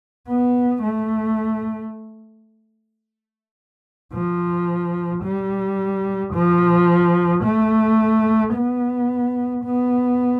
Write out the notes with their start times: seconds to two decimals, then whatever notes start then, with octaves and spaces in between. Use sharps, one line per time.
0.28 B3
0.83 A3
4.13 F3
5.24 G3
6.34 F3
7.44 A3
8.54 B3
9.64 B3